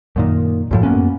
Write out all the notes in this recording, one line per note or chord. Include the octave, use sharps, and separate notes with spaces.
F#2 A#2 D#3
F#2 A2 F3
F#2 A#3 B3 C#4